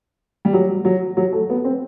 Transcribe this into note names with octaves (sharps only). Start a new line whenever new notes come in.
G3
F#3
F#3
F#3
A3
B3
C4